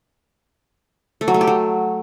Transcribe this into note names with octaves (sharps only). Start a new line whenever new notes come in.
A3
F#3
A3
G4
F#3